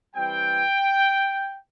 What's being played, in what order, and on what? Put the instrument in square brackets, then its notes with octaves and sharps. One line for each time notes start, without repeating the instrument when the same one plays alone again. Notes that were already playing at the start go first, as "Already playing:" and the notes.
[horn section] E3 G3 C4 G5